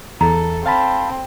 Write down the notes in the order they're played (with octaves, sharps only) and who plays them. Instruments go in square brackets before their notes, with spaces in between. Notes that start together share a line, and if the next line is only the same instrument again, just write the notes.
[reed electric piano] E2 [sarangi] A4 [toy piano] A#5
[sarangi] C4 [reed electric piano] F5 A5 B5